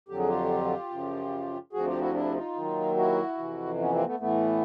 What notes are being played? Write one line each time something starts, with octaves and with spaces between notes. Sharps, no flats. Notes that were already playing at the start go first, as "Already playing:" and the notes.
F2 D3 F#3 G4
G#4
F4 G4
F#2 C#3 F3
D2 C3 F3 F#4 G#4
F4 G4
E4 F#4
D4 E4
D#4 F4
D#2 D#3 F#3
E4 F#4
F2 C3 E3
B3 C#4
A#3 C4
A3 B3
A2 E3 A3 B3